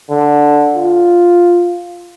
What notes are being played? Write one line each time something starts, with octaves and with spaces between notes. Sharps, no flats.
D3
F4